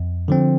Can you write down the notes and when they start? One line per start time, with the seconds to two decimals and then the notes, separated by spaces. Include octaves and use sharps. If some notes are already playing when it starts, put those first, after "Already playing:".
Already playing: F2
0.28 D3 F3 C4